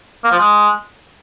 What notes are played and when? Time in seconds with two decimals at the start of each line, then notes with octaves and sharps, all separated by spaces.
0.24 A#3
0.32 F3
0.39 G#3